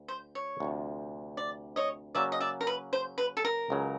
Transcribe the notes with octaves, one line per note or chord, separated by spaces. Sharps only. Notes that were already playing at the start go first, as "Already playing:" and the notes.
Already playing: D2
C5
C#5
D2 C3 F3
D5
C#5 D#5
C#3 F#3 A#3 C#4 D5 E5
D#5
D5 E5
A#4
B4
C5
B4
A4
A#4
C#2 C#3 F#3